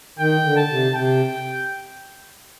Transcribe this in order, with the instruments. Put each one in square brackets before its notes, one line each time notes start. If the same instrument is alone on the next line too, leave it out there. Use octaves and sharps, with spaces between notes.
[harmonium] D#3 [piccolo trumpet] G5
[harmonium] D3
[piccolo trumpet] A5
[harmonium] C3
[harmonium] C3 [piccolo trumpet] G5